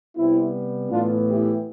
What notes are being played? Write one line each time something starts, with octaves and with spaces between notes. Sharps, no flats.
C3 G3 B3 C4 E4
A2 E3 B3 D4 F4
E4 G4